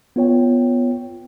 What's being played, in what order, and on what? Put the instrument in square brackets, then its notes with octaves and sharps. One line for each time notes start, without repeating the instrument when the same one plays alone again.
[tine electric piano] B3 F4 C#5 G5